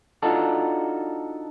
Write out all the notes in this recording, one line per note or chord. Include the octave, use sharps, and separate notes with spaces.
D4 D#4 F4 F#4 A4